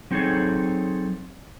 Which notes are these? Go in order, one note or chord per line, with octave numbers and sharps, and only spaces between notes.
F#3 C4 D#4 G#4 A4 C#5